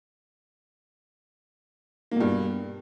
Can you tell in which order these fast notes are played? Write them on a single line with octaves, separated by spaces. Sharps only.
A#3 B2 G2